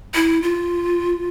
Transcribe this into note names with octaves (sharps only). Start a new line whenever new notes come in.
E4
F4